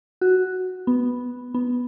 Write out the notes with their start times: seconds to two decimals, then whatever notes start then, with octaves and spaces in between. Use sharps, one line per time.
0.21 F#4
0.87 B3
1.54 B3